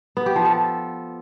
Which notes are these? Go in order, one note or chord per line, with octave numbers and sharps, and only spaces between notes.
B3
G4
F3
A4